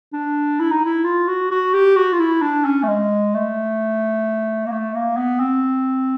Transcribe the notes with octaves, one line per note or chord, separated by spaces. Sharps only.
D4
E4
D#4
E4
F4
F#4
F#4
G4
F#4
F4
E4
D4
C#4
A3
G#3
A3
A#3
A3
A#3
B3
C4